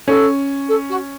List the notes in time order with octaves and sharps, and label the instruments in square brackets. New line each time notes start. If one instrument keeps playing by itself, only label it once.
[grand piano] C#4 [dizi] A4
[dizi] A4
F#4